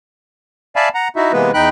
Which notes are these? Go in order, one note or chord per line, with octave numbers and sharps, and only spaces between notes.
D5 E5 F5 G#5 A5 B5
F#5 A#5
D#4 E4 F#4 E5
C3 E3 G#3 A#3 B3 B4
E2 D#4 G5 B5 F#6